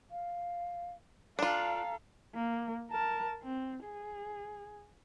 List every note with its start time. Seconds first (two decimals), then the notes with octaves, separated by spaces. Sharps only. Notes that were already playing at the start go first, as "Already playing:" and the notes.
0.11 F5
1.39 D4 F4 A4 F5 A#5
2.35 A#3
2.91 A#4 A5
3.44 C4
3.85 G#4